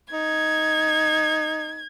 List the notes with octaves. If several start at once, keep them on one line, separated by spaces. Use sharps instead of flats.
D#4 G#6